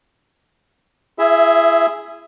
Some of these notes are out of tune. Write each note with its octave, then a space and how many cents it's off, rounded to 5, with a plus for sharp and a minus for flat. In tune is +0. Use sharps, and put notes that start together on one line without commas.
E4 +30 G#4 +0 E5 +0